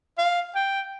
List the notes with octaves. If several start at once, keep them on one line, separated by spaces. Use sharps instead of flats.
F5
G5